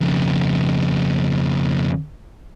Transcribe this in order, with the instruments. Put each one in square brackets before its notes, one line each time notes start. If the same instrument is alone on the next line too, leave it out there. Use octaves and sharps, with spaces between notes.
[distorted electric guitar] F2 C#3